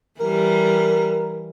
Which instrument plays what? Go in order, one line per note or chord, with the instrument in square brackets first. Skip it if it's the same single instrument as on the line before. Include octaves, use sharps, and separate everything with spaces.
[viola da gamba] E3 G3 [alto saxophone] A#4